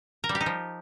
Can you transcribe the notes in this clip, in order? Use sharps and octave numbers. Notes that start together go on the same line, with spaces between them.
A#4
G3
G4
D#4
F3